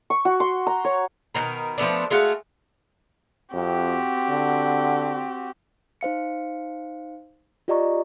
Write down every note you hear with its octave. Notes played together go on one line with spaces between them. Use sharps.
C#6
F#4
C6
A#5
C#5
B2 D#3 A#4
F3 A3 B3 D4
G#3 A3 F#4 F5
F2 C4 F#4 G4
D3
D#4 C5 F5 C#7
F4 G4 D5 D#5 A#5 C#6